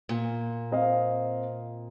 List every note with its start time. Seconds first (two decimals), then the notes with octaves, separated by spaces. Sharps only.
0.09 A#2
0.71 C4 D#5 F5